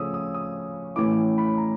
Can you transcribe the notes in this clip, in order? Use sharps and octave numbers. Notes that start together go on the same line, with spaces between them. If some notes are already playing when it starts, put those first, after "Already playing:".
Already playing: C#3 F3 A3 C#4 D#6 E6
D#6
D#6
A2 E3 A3 C#4 E4 D6
B5
A#5